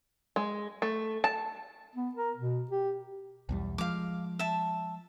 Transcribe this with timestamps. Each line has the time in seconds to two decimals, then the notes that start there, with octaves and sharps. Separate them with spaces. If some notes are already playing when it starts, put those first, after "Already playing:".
0.36 G#3
0.82 A3
1.24 A5
1.95 B3
2.15 A#4
2.37 B2
2.71 G4
3.49 B1 E2 G3
3.78 F3 G#3 F5 D6
4.39 E5 A5